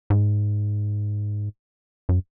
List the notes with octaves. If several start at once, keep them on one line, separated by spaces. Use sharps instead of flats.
G#2
F#2